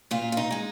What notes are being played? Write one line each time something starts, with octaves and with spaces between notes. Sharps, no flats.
A#2 F4
F4
D#4
G#3 D#4